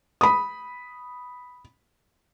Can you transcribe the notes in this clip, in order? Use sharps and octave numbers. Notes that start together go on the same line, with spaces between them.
B5 D#6